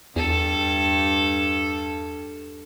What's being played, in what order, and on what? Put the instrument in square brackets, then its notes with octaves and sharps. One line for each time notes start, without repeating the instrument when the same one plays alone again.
[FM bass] E2 [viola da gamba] G2 [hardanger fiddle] A4